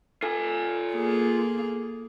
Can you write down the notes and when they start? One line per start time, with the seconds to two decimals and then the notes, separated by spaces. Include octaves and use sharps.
0.23 F4 A4 G#5
0.94 A#3 G#4